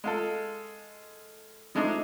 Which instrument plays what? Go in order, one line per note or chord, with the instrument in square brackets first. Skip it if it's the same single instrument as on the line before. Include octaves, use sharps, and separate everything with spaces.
[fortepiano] G#3 F4 A4
F3 G#3 A3 D4 D#4